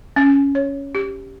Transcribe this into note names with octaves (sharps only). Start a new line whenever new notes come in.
C#4
C#5
G4